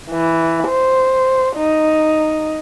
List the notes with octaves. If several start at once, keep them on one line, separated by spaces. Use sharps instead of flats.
E3
C5
D#4